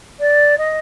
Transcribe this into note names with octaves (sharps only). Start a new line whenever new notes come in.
D5
D#5